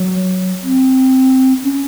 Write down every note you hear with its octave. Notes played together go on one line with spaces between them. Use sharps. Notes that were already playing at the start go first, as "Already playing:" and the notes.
Already playing: F#3
C4
C#4